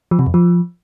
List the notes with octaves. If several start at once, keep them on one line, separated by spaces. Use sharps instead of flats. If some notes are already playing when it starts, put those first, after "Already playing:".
F3
C3
F2
F3